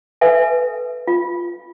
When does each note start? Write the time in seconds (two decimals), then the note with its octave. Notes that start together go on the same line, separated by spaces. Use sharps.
0.21 A4 B4 E5 G#5
1.07 F4